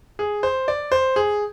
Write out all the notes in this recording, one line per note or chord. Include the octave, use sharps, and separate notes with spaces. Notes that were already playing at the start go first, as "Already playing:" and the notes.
G#4
C5
D5
C5
G#4